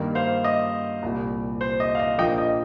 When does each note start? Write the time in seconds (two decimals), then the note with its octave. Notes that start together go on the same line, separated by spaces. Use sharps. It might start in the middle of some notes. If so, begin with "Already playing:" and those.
Already playing: G2 D#3 A#3
0.15 C5 F5
0.44 D#5
1.02 C2 A#2 G3
1.61 C5
1.80 D#5
1.95 F5
1.99 D#5
2.18 A#1 A#2 F3 A#3 D#5 G5
2.38 D#5